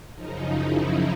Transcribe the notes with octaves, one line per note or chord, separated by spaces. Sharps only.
F#2 C#3 F3 D#4
E4